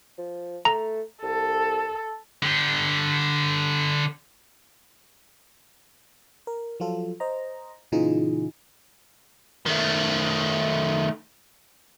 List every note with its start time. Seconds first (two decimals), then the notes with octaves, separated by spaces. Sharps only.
0.18 F3
0.65 A3 A#5
1.23 C2 A4
2.43 D3 G4
6.47 A#4
6.80 F3 F#3 F4 A4
7.20 C5 D#5 A#5
7.92 A#2 C#3 E3 D#4 F4 G#4
9.66 D#3 A3